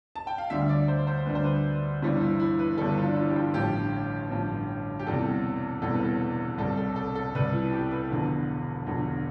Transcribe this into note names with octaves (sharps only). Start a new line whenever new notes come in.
A5
G5
F5
D2 D3 G3 E5
D5
C5
C5
D2 D3 G3 B4
C5
B4
G1 G2 E3 G3 E4
E4
E4
B4
G1 G2 E3 G3 A4
F4
D4
E4
G4
F4
A1 G2 F3 G4
A1 G2 F3
G4
E1 E2 C3 E3 G3 A4
E1 E2 C3 E3 G3 A4
B4
A4
C2 C3 G3 A4
A4
A4
A4
C2 C3 G3 B4
E4
G4
B4
E1 E2 D3 F3
E1 E2 D3 F3